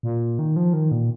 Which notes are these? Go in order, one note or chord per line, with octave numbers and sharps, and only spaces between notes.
A#2
D#3
F3
D#3
A#2